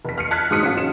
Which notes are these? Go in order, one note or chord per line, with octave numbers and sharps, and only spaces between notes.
F1 B6
F6 C7 C#7
A5 F6 F#6 G#6 B6
G#2 F#3 D#6 C#7
C#4 F4
F#3 C#4 E7